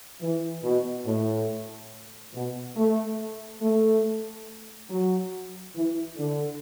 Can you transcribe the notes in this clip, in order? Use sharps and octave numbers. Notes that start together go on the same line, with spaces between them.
E3
B2
A2
B2
A3
A3
F#3
E3
D3